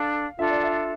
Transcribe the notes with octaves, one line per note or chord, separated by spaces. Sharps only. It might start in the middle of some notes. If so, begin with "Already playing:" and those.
Already playing: D4 A4 F5
D4 F4 A4 E5
D5
E5